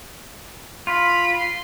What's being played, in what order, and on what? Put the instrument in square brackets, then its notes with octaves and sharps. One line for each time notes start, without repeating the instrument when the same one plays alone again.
[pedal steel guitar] F4 [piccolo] B5
[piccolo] C6